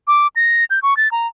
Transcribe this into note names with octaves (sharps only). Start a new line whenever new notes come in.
D6
A#6
G6
C#6
A6
A#5